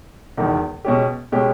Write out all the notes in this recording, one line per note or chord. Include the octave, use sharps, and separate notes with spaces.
E1 E2 D#3
B2 G#3 C#4 G4
B2 G#3 C#4 G4